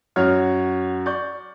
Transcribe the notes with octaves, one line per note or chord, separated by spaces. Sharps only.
F#2 F#4 C#5 F6
D5 C#6 G6